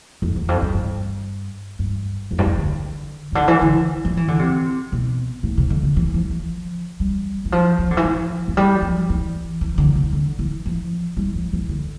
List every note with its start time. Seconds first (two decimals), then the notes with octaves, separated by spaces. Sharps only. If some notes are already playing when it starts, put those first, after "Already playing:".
0.22 F2
0.36 E2
0.48 F2
0.62 G2
0.74 G2
1.79 G2
2.31 F2
2.39 G2
2.46 F2
2.57 D3
3.32 C3
3.35 D3
3.48 E3
3.62 D3
4.05 F3
4.17 E3
4.28 D3
4.39 C3
4.92 B2
5.43 A2
5.57 C3
5.70 D3
5.83 D3
5.97 E3
6.14 F3
6.30 F3
7.00 G3
7.45 E3
7.52 F3
7.79 F3
7.91 D3
7.97 E3
8.04 F3
8.48 F3
8.57 G3
8.82 F3
9.09 E3
9.61 E3
9.78 D3
9.95 C3
10.13 D3
10.39 E3
10.66 F3
11.17 G3
11.35 F3
11.53 E3
11.69 D3